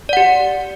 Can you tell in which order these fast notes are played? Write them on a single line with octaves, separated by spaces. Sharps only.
D5 F#5 G4